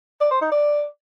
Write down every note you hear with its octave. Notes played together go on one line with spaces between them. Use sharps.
D5
C5
D#4
D5